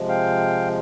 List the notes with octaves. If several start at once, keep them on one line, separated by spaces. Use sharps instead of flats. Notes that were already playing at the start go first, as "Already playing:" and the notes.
Already playing: C3 F3 G#3
F5 G5